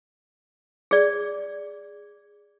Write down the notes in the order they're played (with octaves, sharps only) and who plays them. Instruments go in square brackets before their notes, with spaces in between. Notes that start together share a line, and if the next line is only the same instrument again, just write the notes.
[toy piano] G#4 D5